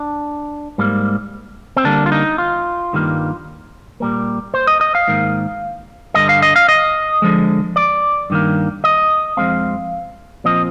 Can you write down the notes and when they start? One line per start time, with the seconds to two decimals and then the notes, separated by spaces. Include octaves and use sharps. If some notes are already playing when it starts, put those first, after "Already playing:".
Already playing: D4
0.78 G#2 G3 A#3
1.77 C4
1.85 D3 G3 A#3 D4
2.06 F4
2.12 D#4
2.38 F4
2.93 G2 D#3 G3 A#3
4.00 A#2 G3 A#3
4.54 C5
4.67 D#5
4.81 D#5
4.95 F5
5.08 G#2 D#3 A#3
6.14 G2 D3 G3 D#5
6.29 F5
6.42 D#5
6.56 F5
6.69 D#5
7.22 D3 F3 G#3
7.76 D5
8.30 G2 D#3 A#3
8.84 D#5
9.37 F2 D3 G#3 C4 F5
10.44 A#2 F3 C4 D#5